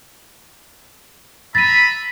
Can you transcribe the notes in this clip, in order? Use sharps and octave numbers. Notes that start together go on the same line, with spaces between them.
E5 A#5 B5 A6 D#7